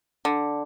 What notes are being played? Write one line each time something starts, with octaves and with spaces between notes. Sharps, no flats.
D3